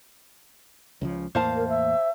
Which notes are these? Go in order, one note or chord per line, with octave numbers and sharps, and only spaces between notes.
C#2 C#3 F3
E2 A2 A#3 C5 F5 A5
A#4
E5